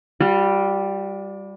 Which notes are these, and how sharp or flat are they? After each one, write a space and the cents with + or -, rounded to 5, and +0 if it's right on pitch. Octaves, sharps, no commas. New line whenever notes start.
G3 +0 F4 +45